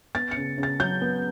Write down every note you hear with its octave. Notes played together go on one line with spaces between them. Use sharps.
B3 A6
C#7
C#3
C#3
A6
F#3 G6
B3